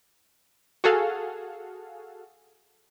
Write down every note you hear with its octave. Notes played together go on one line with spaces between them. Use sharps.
F#4 G#4 A4 F5